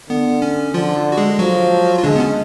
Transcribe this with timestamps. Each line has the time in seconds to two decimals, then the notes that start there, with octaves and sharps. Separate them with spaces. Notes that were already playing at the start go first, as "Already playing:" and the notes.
0.09 D3 B3
0.42 C#4
0.74 D3 F3 F4
1.12 F#4
1.17 G#3 G#4
1.39 F3 F#3 F#4
1.98 F4
2.04 D3 G#3 D4
2.16 B3
2.20 C#4